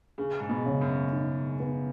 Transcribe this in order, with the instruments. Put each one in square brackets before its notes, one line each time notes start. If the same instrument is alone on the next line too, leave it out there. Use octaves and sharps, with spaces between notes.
[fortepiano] C#3 [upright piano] G#4
[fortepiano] G#2
B2
[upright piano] C#3
[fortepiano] F#2
[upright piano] D#4
B3